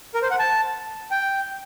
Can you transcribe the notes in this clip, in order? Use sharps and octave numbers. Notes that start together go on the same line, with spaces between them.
A#4
C5
F#5
A5
G5